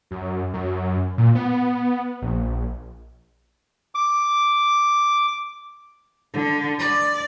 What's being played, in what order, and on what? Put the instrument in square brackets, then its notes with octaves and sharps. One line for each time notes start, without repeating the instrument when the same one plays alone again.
[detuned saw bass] F#2
F#2
A#2
B3
A#1
[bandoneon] D6
[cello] D3
D5